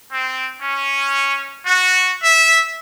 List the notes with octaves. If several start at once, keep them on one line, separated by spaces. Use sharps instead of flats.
C4
C#4
F#4
E5